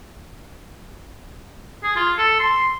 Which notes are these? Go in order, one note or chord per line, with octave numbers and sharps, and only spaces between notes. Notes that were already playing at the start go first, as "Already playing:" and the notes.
G#4
F4
A4
C6